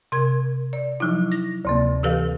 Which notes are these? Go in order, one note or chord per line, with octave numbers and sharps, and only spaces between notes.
C3 A#4 G#6
D5
F3 F#3 D#4 E4
A#6
D2 C3 A#3
E3 G4 A4 B4 F5